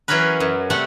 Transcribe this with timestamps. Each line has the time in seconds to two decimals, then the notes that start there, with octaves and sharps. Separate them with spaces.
0.08 E3 F#3 C#4 G#4 A#4 B4
0.40 F#2
0.70 C3 G3 A3 G4 A4 F#5